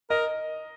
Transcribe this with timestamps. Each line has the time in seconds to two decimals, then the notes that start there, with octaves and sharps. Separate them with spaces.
0.10 A#4 D#5